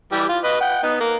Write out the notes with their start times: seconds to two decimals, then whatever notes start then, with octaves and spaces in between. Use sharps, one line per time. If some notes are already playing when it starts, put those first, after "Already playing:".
0.12 E3 G3 G4
0.29 F4
0.44 B4 D#5
0.61 F#5 G5
0.83 B3 D#4
1.00 A#3